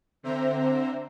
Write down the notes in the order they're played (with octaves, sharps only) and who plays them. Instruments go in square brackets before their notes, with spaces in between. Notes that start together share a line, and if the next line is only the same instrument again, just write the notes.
[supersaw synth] D3 C4 C5 E5 A#5